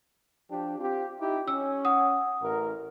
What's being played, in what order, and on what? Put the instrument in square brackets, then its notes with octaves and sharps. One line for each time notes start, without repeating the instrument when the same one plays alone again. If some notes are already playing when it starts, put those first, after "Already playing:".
[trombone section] F3 D4 G4
C4 F4 G4
D#4 E4 G4
[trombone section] C#4 [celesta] E6
[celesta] F#5 D#6
[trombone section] A1 A#4